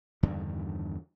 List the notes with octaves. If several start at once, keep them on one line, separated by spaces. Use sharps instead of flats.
E2 G2 D3 D#3